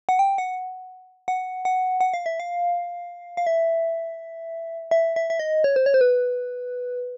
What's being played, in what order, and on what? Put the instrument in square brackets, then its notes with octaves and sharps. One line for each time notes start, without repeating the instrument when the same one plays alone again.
[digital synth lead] F#5
G5
F#5
F#5
F#5
F#5
F5
E5
F5
F5
E5
E5
E5
E5
D#5
C#5
C5
C#5
C5
B4